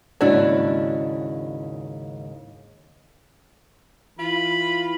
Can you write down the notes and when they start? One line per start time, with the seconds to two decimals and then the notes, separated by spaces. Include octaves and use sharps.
0.21 D#2 G#2 C#3 D4 E4 F#4
4.19 E3 F4 B5